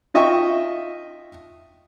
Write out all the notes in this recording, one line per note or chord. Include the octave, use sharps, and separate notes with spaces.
D#4 F4 D#5 E5 G5 C#6